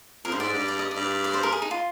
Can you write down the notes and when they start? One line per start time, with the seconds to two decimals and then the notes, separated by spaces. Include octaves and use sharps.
0.25 F2 A#4
0.32 G2 C5
0.40 G#2 D5
0.54 G2
0.68 D5
0.79 D#5
0.91 G2 D5
1.24 D5
1.34 C5
1.43 A#4
1.52 G#4
1.62 D#4
1.71 F4